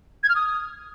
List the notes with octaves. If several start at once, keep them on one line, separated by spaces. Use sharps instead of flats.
G#6
F6
D#6